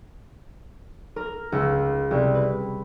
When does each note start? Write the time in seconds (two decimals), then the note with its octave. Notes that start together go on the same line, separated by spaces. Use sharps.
1.16 A#4
1.52 C#2
2.11 C2
2.35 B4